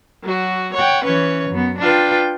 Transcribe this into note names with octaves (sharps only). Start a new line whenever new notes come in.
F#3 F#4
C#5 F#5 G5
E3 C#4 B4 C#5
F#2 B3
D4 F4 B4 G5